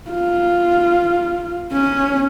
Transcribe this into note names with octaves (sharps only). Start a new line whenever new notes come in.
F4
C#4